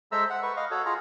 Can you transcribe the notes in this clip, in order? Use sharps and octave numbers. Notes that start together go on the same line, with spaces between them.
G#3 A4 C5 E5 A#5 E6
F#5
B4 C#6
D#5 F5
F#4 A4 C#5
F4 G#4 A#5